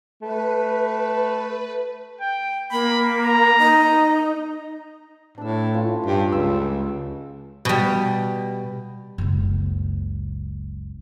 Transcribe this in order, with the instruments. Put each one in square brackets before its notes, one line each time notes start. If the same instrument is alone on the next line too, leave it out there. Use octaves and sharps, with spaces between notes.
[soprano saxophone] A3 [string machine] B4
[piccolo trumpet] G5
[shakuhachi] A#3 [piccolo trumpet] B5
[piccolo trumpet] A#5
[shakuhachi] D#4
[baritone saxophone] A2 [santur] D4 E6
[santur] C#4 F4
[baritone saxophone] G2
[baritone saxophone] C#2 [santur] E6
[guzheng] B2 G3
[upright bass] F#1 C#2